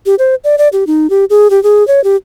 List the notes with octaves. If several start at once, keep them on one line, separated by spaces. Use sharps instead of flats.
G4
C5
D5
D5
G4
D#4
G4
G#4
G4
G#4
C#5
G4